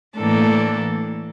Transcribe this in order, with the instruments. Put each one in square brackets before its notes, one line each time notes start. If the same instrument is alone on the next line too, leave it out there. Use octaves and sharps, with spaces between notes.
[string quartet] A2 E3 A#3 D4 A4